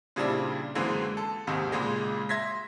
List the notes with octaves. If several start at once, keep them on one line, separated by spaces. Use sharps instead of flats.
A#2 C#3 G3 C4 D4 E4
F#2 D3 E3 G#3 A#3 C4
A4
D#2 G#2 C3 D#3
C#2 A#2 G#3
E5 C6 G#6 A#6 B6